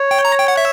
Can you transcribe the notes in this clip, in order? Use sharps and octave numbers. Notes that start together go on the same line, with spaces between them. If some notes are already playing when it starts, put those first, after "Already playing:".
Already playing: C#5
G5
A#5
G5
F#5
E5